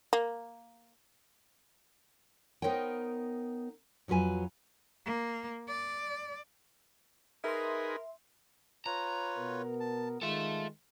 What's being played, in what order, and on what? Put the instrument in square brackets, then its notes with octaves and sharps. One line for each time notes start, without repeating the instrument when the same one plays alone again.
[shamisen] A#3
[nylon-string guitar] B3 D#4 A#4 C5 C#5 G5
F2 F#3 F4 B4 G#5
[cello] A#3
D5
[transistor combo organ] D#4 G#4 B4 [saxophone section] A#4 [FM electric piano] E5 C6
[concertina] F4 B4 C#5 [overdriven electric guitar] A#5
[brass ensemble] B2 B3 A#4
[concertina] A5
[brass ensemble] D#3 G#3 [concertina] F4 [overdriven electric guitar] A4 E5